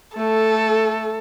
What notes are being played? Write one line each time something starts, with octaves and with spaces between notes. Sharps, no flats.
A3 A4